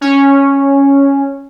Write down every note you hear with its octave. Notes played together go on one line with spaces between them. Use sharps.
C#4